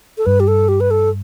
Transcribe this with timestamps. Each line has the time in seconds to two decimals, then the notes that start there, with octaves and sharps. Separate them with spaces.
0.18 A4
0.26 G2 B4
0.40 G4
0.48 A4
0.69 G4
0.80 B4
0.91 A4